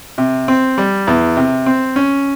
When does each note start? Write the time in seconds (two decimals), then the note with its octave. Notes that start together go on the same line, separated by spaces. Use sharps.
0.18 C3
0.48 C4
0.78 G3
1.07 E2
1.37 C3
1.66 C4
1.96 C#4